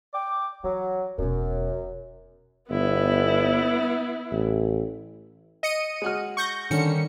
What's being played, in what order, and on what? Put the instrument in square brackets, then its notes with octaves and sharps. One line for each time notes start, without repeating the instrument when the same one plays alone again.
[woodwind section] G5 D6
[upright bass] E3 [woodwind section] F#3
[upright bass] E1 B2 [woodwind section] F#2
[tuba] G1 [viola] B3 E4
[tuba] A1
[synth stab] D#5 C#7 D#7
[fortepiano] G#3 F#4 F6
[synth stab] C#6 G6 A#6
[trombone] D3 [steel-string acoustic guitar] D#3 G3 [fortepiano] C#4 [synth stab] C#7